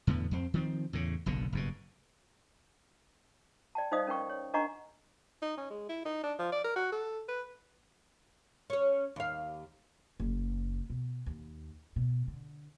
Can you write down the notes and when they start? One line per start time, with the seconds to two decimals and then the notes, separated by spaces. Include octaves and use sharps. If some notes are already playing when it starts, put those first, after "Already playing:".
0.07 E2 A2 D3 B3
0.31 F2 C4
0.54 D#3 F3 B3 C4
0.93 E2 A2 C#3
1.26 F#1 B1 B2 D3
1.52 F#1 G2 B2
3.75 D5 G5 A5
3.92 D#4 C5 D5 D#5 F5 D#6
4.07 C#4 A#4 B4 G5 C#6
4.29 C#5
4.54 D4 A#4 D#5 F#5 A#5 C#6
5.42 D#4
5.57 C#4
5.70 G#3
5.89 E4
6.05 D#4
6.23 D4
6.39 F3
6.52 D5
6.64 A#4
6.76 F#4
6.92 A4
7.28 B4
8.70 C#4 C#5
9.16 D#2 F5
10.20 F#1
10.90 B2
11.26 D#2
11.96 B2
12.28 D3